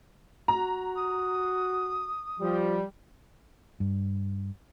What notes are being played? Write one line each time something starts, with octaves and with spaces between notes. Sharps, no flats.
F#4 A#5
D#6
F3 G3
G2